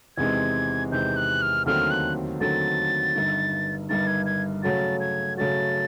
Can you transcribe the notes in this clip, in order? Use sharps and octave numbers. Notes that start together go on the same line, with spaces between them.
E2 C3 D#3 G#3 C4 G#6
E2 C3 D#3 G#3 C4 G6
F#6
F6
D#2 D3 F#3 A3 C4 F6
F#6
D#2 D3 F#3 A3 C4 A6
G1 G2 D#3
G1 G2 D#3 A6
G#6
G#6
C#3 F#3 A3 C#4 F#4 A6
G#6
C#3 F#3 A3 C#4 F#4 A6